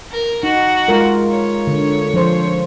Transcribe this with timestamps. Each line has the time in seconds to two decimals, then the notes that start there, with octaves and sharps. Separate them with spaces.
0.11 A#4
0.43 D#4 F#4
0.88 G#3 F4 A#4
1.30 C#5
1.67 D3
2.14 F3 C5